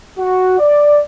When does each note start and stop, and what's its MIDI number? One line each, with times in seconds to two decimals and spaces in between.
0.18 0.57 66
0.59 1.02 74